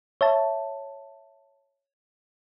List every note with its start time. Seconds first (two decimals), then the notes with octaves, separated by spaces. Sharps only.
0.21 C#5 E5 A5